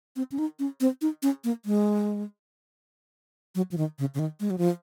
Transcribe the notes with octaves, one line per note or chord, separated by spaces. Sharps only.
C4
C#4
D#4
C#4
C4
D#4
C#4
A#3
G#3
F#3
F3
D#3
C#3
C#3
D#3
G#3
F#3
F3